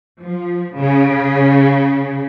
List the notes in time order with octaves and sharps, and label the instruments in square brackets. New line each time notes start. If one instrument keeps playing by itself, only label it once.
[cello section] F3
C#3